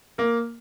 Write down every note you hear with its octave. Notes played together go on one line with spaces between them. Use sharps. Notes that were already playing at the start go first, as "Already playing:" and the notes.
A#3 A#4